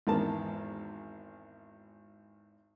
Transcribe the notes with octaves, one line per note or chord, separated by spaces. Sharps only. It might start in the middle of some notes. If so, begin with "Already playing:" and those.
G#1 E2 G#3 B3 A#4 A5